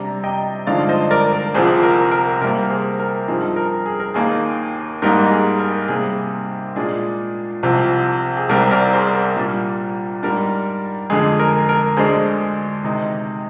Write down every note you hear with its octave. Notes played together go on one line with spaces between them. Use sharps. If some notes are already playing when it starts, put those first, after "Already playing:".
Already playing: C3 G3 D4 A#5
D#5 G5
G2 D3 F3 G#3 D#4 D5 F5
C5 D#5
A#4 D5
A#4
C2 C3 F3 G#4 C5
A#4
A#4
C3 G3 A#3 A#4
G#4 C5
A#4
G2 F3 C4 D#4 G#4 C5
A#4
G#4
A#4
D#2 D#3 A#3 G#4
G#2 G3 A#3 D#4 A#4
G#4
A#4
C3 G3 A#3 G#4
A#2 G#3 D4 G#4
C2 C3 F3
G#4
C2 C3 G3 C4 A#4
A#4 D5
G#4 C5
A#4
A#2 G3 D4
G#2 G3 D4 A#4
F2 D3 G#3 G#4
A#4
A#4
D2 D3 G#3 D4 G#4 C5
C3 D#3 G#3 D#4